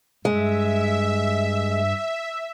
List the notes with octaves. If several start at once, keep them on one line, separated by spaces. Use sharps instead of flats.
G2 G#3 E5